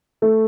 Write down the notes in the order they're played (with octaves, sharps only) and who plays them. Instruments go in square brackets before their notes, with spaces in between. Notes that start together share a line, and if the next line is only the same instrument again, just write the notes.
[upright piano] A3